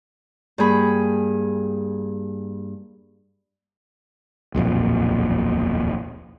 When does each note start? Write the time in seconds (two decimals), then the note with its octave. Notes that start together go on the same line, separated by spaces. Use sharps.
0.58 G2 A#3 G#4 B5
4.55 D#1 B1 F2 A#2